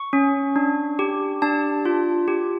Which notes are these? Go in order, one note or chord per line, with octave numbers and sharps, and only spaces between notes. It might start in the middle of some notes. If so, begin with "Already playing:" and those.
Already playing: C#6
C#4
D4
G4
D4 A5
F4
G4